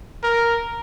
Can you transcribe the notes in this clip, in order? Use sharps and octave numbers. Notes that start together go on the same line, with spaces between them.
A#4